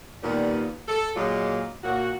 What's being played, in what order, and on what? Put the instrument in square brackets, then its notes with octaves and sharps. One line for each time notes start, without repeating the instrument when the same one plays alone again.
[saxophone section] D#2 A#2 G3 B3
A4
A#2 F#3 G#3 A#3 F4
A#2 A#3 F#4